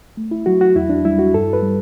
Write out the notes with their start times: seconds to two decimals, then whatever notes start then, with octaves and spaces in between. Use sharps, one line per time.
0.17 A3
0.31 E4
0.46 F#3 F#4
0.61 F#4
0.76 E2 E4
0.90 D4
1.05 G3 E4
1.19 F#4
1.34 G2 A4
1.53 B4
1.63 G3